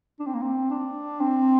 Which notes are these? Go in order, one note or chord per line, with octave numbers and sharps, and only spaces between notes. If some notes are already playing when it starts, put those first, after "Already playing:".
D4
C4
A#3
C4
D4
C4